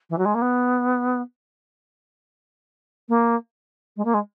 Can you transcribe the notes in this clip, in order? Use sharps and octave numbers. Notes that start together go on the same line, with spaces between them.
E3
F#3
G#3
A#3
B3
A#3
G#3
A#3
G#3